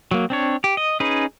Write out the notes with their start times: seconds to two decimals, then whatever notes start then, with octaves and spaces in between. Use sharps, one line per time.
0.11 F#3 A#3
0.30 C4 D4 C#5
0.64 G4
0.77 D#5
1.00 C#4 D#4 G#4 B4